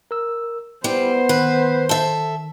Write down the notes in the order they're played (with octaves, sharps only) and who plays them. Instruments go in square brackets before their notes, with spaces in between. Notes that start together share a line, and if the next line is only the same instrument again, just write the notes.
[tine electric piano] A#4 E6
[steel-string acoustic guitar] G3 [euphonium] B3 [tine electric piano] E4 [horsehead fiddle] C5
[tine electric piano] D#3 [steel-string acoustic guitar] B4
[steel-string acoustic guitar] A4 E5